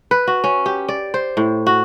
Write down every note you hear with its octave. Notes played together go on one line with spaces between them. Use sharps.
B4
F#4
C#4
G4
D5
C5
A2
F#4